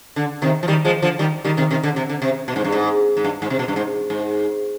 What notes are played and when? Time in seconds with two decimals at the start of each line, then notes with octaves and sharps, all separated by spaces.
0.16 D3
0.42 C3 D#3
0.63 F3
0.68 D#3 G3
0.85 F3 G#3
1.02 D3 F3
1.19 D#3 G3
1.45 D#3 G3
1.57 C3 D#3
1.71 C3 D#3
1.83 D3
1.96 C3
2.09 D3
2.22 C3
2.48 B2
2.56 G#2
2.64 G2
2.72 G#2
3.17 G#2
3.24 G2
3.42 G#2
3.50 C3
3.59 B2
3.68 G2
3.76 G#2
4.10 G#2